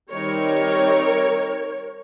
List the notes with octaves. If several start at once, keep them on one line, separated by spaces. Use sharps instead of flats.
D#3 G3 C4 D#4 A#4 C#5